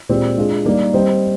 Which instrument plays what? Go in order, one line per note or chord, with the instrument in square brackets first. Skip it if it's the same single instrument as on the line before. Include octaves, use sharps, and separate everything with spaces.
[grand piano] A#2 G#3 C4 G4 D5
G#3 D4 F4 G#4
G3 A#3 D#4 A#4 D5
G3 C4 G4 C5 D#5